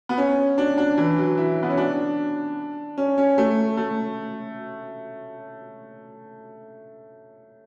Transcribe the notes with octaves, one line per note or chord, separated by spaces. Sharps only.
B3
C#4
D4
D4
E3
F#3
E4
B3
C#4
D4
C#4
C#4
A3
A3